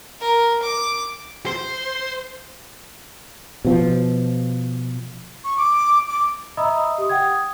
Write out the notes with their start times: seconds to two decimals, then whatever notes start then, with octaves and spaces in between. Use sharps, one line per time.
0.21 A#4
0.63 D6
1.46 C5
3.65 B2 F3
5.44 C#6
5.57 D6
6.09 D6
6.57 D#5 E5 A#5 B5 D#6 E6
6.98 G4 D#6
7.09 F#5 G5 D#6 G#6